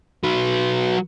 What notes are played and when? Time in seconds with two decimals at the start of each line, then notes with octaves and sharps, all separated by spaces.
0.23 F#3 B4